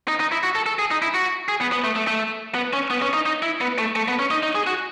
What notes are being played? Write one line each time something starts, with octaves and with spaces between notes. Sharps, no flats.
D#4
D#4
E4
F#4
A4
A4
G#4
D#4
E4
F#4
G#4
B3
B3
A3
A3
A3
B3
C#4
B3
C#4
D#4
D#4
E4
B3
A3
A3
B3
C#4
D#4
D#4
G#4
F#4